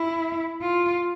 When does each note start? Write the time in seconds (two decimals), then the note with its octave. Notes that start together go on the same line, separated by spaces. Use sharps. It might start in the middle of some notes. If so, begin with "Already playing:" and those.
Already playing: E4
0.62 F4